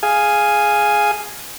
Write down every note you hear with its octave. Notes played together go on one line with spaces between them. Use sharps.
G#4 F5 G#5